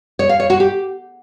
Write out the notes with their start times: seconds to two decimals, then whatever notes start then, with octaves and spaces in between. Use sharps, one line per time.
0.19 C#5
0.29 F5
0.40 C#5
0.50 F#4
0.60 G4